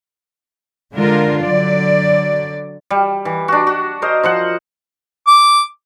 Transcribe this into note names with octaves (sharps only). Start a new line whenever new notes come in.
D3 G#3 D4 F4 A#4
D3 F#3 D5
G3
E3
D4 F#4
F#4
A#4 C5 D#5
F3 C5 F#5
D6